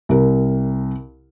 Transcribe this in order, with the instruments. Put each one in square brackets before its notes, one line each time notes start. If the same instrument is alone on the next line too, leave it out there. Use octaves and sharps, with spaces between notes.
[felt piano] C2 A#4